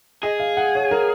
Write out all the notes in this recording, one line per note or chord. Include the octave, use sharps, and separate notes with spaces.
G#4 D#5
F5
F#5
C#5
A#4